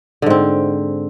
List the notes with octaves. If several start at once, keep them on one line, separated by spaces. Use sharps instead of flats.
G#2 D3 C4